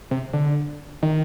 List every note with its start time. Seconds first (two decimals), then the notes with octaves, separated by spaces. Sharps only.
0.11 C3
0.33 D3
1.03 D#3